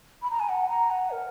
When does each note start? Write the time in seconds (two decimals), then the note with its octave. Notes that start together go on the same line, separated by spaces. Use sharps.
0.22 B5
0.31 A#5
0.40 G#5
0.49 F#5
0.70 A#5
0.91 F#5
1.11 A#4